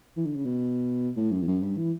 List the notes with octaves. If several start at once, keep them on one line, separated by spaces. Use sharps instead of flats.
E3
D3
C#3
B2
A2
F#2
E2
F#2
G2
E3